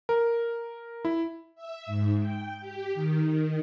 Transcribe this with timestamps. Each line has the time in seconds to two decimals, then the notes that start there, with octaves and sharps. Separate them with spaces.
0.09 A#4
1.05 E4
1.55 E5
1.86 G#2
2.19 G5
2.60 G4
2.94 D#3